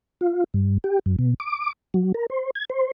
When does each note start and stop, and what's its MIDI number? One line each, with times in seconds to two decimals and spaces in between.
0.21 0.44 65
0.54 0.78 43
0.84 0.99 67
1.06 1.16 42
1.19 1.34 47
1.40 1.72 86
1.94 2.12 54
2.14 2.26 70
2.30 2.50 72
2.55 2.65 92
2.70 2.91 72